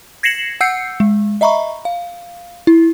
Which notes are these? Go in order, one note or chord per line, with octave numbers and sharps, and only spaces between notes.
G#6 A#6 C7 C#7 E7 F#7
F#5 E6 G6 C7 C#7
G#3
D#5 E5 A#5 B5 C#6
F5
E4